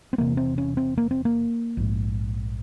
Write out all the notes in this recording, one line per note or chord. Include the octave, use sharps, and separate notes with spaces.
C4
E1 E2 C3 A#3
C4
C#4
C4
A#3
C4
A#3
A#1 G#2